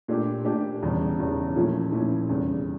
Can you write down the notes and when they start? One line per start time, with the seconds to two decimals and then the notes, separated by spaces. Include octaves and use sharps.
0.08 A#2 A3 D4 G4
0.45 A#2 A3 D4 G4
0.82 E1 E2 C#3 G3
1.19 E1 E2 C#3 G3
1.56 A#2 F3 A3 C#4 E4
1.92 A#2 F3 A3 C#4 E4
2.29 F1 E2 C#3 G3